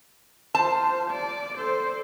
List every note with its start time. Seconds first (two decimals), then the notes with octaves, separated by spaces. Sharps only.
0.55 F4 C5 A5
1.11 D5
1.57 A4 C5